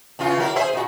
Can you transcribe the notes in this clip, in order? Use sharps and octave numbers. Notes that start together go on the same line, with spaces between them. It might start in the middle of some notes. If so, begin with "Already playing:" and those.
E2 C#3 F4
F#3 E4 A#4
G#4 C5 E5
A#2 F#4